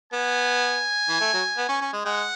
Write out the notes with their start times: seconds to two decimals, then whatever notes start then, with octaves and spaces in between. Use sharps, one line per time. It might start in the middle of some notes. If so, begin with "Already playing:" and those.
0.12 B3 G#5
1.08 E3
1.20 A3
1.33 F#3
1.57 B3
1.68 C#4
1.81 C#4
1.93 G#3
2.05 G#3 F#5